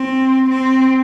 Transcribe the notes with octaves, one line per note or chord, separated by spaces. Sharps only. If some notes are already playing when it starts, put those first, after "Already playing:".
Already playing: C4
C4